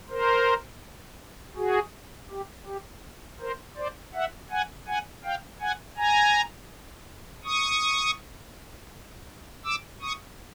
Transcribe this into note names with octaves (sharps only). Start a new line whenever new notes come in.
A#4 C5
F#4 G#4
G4
G4
A#4 C5
C5 D5
E5 F#5
F#5 G#5
F#5 G#5
F5 G5
F#5 G#5
G#5 A#5
C#6 D#6
D6 E6
C#6 D#6